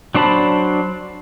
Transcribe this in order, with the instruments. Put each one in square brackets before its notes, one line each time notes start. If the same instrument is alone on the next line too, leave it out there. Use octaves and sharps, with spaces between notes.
[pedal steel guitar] F#3 D4 C5 A5 B5